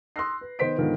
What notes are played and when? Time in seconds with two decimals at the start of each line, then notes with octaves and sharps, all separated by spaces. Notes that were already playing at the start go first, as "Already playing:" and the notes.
0.16 C6 D#6 E6 F#6 A#6 C7
0.41 B4
0.59 D#3 B3 C5 D#5 B6 D7
0.78 G#2 D3 D#3 B3 F4